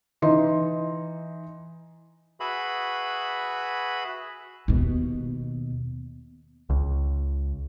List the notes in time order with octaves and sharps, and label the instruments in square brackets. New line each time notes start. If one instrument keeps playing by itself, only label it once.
[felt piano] E3 D#4 C6
[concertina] F#4 G#4 B4 E5 B5
[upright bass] D#2 B2
[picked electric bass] C#2